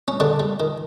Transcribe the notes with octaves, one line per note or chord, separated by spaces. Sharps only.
C#4
D3 G3 D4
G3
D#3